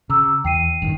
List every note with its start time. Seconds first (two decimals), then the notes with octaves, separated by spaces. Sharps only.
0.10 C#3 A#5 D6 E6
0.44 E2 G5 C7 D#7
0.82 A1 G2 D#3